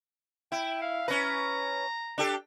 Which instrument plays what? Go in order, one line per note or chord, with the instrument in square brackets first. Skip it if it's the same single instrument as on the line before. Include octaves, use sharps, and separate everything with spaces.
[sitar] E4 [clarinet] G5
[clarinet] F5
[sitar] C#4 B4 [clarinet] A#5
[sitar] D4 G4 A4